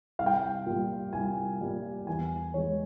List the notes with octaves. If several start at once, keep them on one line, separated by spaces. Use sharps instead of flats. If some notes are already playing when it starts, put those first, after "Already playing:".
C2 F5
G5
F5
A#2 G3
C2 G#5
A#2 G3
E2 G#5
E3 G#3 C#5